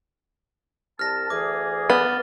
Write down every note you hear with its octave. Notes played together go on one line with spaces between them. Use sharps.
C2 A5 F6 A#6
D2 E3 G#4 D6
B3 F6 A6 G7